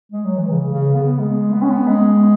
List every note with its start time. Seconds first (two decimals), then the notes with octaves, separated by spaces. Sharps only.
0.12 G#3
0.25 F#3
0.37 E3
0.50 C#3
0.73 C#3
0.95 B3
1.19 G#3
1.53 B3
1.62 C#4
1.70 B3
1.87 G#3